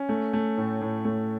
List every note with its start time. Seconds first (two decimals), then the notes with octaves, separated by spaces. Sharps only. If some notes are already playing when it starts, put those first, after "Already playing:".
Already playing: C#4
0.09 A3
0.33 A3
0.58 A2
0.81 A2
1.05 A3